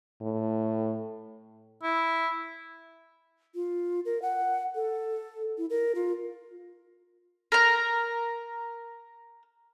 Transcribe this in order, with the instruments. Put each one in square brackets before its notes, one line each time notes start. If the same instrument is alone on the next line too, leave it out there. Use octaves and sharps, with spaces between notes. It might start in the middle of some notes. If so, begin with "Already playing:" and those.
[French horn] A2
[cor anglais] E4
[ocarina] F4
A#4
F#5
A4
E4
A#4
F4
[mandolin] A#4 A#5